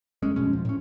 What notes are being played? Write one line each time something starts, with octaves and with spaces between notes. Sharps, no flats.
F#1 G#3 C#4
F2 B2 G#3 C#4
F3
A2 C#4